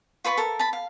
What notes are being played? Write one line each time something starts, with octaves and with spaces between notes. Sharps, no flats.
F4 B4 B5 C#6
A4 A#4
A5 B5
F5